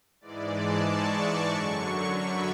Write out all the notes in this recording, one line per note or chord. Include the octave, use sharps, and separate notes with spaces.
G#2 E3 G#3 D5
A5
C#6
C#6
F#2 D3 F#3 C#6
B5